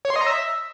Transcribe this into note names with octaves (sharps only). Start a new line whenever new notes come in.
C#5
C6
D#5
A#5
E5